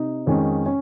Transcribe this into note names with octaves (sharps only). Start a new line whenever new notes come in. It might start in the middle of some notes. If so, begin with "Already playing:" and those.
Already playing: C3 D#4
F2 D#3 G#3 C#4
C#4